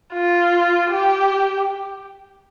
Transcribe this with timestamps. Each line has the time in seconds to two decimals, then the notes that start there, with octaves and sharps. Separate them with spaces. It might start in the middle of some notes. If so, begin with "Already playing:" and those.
0.13 F4
0.90 G4